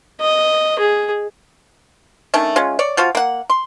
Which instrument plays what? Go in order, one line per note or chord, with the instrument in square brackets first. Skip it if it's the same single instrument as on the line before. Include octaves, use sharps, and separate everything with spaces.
[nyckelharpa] D#5
G#4
[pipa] D#3 A3 C#4 D4
G#3 C#4 F4
C#5 D5
F3 F4 F#4 F5
A#3 F#5
C6